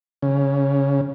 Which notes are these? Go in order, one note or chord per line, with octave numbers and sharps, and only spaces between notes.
C#3